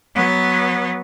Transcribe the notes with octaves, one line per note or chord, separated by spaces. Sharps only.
F#3 B3